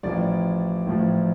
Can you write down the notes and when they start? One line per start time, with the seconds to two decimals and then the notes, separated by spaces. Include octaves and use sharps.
0.03 A1 A2 F3 D5
0.87 A1 A2 F3